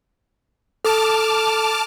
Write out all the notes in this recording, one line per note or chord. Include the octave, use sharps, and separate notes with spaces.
A4 A5 D6 F6